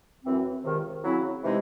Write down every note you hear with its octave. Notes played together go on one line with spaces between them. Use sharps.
F#2 E3 C4
C#2 C3 D#3
C#3 F#3 C4 E4
C3 E3 G#3 D#4